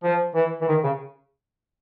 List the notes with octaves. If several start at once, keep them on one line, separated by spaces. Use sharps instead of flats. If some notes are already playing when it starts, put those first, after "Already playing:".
F3
E3
E3
D#3
C#3